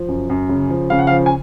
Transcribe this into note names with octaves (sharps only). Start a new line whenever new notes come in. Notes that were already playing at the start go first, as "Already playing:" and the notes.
Already playing: F3
F#2
F#2
C#3
F3
C#3 F5
F#5
F5
F3
G#5